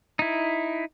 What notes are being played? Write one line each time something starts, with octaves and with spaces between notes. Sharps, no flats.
D#4 E4